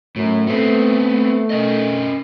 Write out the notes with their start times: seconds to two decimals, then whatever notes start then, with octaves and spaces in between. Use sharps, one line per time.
0.16 F#2 A2 F#3
0.47 A3 B3 C4
1.50 C#4 A#4 D#5